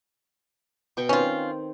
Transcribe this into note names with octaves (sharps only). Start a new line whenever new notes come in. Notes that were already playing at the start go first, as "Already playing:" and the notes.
B2 G5 C#6
D#3 C4 C#4 F4